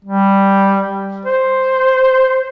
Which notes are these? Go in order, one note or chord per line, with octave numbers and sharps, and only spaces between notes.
G3
C5